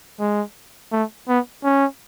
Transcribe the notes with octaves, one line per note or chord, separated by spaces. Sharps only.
G#3
A3
B3
C#4